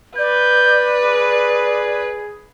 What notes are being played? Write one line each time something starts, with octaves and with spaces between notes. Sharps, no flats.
B4 D5 G6
G#4